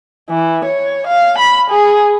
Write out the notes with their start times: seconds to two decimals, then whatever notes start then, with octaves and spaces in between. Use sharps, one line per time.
0.30 E3
0.65 C#5
1.07 F5
1.39 B5
1.71 G#4